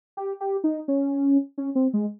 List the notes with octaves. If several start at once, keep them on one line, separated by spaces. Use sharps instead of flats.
G4
G4
D#4
C#4
C#4
C4
G#3